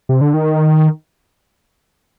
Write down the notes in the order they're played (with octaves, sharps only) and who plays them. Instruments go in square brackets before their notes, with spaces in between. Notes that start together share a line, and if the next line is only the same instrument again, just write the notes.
[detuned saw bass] C3
D3
D#3